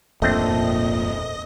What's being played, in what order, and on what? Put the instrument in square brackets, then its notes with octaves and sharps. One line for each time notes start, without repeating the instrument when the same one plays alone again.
[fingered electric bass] D#1 G#1 F2 [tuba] A#2 [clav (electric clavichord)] A3 C4 D4 [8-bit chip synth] D#5